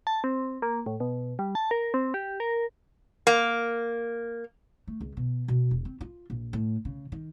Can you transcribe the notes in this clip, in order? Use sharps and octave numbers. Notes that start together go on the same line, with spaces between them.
A5
C4
A#3
A2
B2
G3
A5
A#4
C4
G4
A#4
A#3
A3
C#2
B2
B2
E1
C4
F4
A#1
A2
C#3
D#3